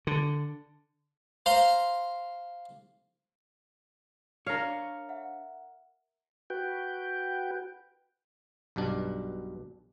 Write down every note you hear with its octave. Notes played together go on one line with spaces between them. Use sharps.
D3
C5 F5 A#5 C6
D4 A#4 C#5 F5
E5 F#5
F#4 B4 G5
B1 G2 B2 D4